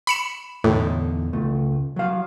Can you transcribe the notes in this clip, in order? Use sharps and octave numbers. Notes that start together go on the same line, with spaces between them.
B5 C#7 E7
E2 A2 D3 D#4
C#2 A3
F#3 F5